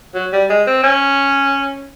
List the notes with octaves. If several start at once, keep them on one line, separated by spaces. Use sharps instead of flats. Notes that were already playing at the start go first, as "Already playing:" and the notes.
F#3
G3
G#3
C4
C#4